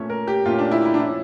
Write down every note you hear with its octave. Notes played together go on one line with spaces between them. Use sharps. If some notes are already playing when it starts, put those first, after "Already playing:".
Already playing: A#2 A3 C#4 C#5
A#4
G4
A#2 A3 C#4 F4
D4
E4
E4
D4
F3 C#4 E4